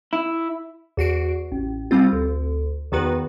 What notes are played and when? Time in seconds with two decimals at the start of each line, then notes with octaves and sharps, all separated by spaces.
0.13 E4
0.97 E2 F#4 C7 D7
1.52 A1
1.91 G3 C4 F4
2.12 D2
2.92 E2 D#3 B3 F#4 B4